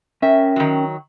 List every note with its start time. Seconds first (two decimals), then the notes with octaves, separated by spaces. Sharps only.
0.22 C#4 A#4 E5 G5
0.56 D#3 F#3